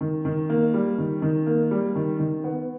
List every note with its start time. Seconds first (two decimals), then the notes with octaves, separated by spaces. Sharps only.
0.01 D#3
0.25 D#3
0.49 A#3
0.74 G3
0.98 D#3
1.22 D#3
1.47 A#3
1.71 G3
1.95 D#3
2.19 D#3
2.44 B3